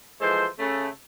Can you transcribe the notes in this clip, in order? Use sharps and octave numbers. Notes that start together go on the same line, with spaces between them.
E3 F3 G#3 A4 C5
C#3 A3